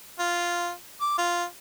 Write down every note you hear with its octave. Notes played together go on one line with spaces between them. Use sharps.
F4
D6
F4